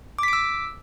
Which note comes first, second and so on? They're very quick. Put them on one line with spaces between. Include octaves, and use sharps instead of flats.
D6 B6 D7 E6